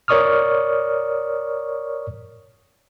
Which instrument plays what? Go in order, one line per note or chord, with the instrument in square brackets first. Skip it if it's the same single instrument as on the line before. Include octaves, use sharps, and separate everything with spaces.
[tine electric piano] A#4 C#5 D5 C#6 D#6 F6